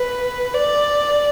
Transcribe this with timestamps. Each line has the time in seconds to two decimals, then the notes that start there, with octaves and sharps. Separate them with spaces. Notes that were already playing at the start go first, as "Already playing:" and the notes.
Already playing: B4
0.54 D5